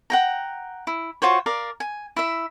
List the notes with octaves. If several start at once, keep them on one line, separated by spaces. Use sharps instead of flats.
F#5 G5 A#5
E4
F4 F#4 C5 C#5
A#4 D5 F5
G#5
E4 E5